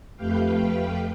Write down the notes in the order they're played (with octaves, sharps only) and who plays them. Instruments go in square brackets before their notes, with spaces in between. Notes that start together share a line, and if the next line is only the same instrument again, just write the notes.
[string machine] F2 A3 G4 B4 F5 G5